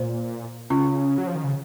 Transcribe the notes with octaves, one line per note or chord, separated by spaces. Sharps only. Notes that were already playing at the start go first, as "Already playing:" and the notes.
Already playing: A#2 C5
C#3 C#4 F4
F#3
F3
D#3
C#3